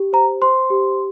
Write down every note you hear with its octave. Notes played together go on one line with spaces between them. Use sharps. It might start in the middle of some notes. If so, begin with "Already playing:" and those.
Already playing: G4
C5 A#5
C5 C6
G4